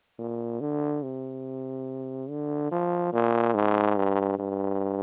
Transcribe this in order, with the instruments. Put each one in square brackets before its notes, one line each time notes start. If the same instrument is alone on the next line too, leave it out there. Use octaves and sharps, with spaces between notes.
[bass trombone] A#2
D3
C3
D3
F3
A#2
G#2
G2
G2